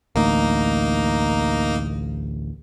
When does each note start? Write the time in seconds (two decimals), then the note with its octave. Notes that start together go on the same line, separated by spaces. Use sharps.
0.16 A1 D2 A#3 D#4